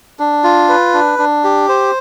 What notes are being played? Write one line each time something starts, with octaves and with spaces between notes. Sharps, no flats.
D4
F4
B4
D4
D4
G4
C5